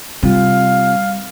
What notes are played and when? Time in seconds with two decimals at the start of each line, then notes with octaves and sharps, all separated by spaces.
0.23 C3 G3 F4 F5